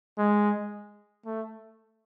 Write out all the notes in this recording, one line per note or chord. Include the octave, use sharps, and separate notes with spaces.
G#3
A3